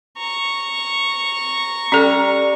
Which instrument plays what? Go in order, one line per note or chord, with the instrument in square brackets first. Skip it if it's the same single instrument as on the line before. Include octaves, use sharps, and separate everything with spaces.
[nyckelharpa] A#5 C#6
[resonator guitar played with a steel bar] G3 [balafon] C#4 A4